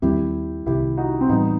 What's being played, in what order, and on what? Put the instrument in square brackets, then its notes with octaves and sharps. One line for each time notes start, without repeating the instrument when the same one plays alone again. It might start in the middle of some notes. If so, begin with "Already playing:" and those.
[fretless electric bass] D#2 D#3 G3 C4 [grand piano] E4 G4
[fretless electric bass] C2 C3 D#3 [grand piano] E4 G4
[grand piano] D#4 F#4
C4
[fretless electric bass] A2 E3 G3 [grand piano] B3 D#4